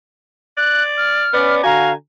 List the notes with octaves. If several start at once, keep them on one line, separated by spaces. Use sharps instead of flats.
D5 F#6
F6
B3 C#4 B4 D5
D3 F#4 F5 G#5 A#5